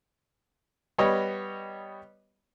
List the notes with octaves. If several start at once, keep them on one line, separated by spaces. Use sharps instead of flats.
G3 B3 C#5 D#5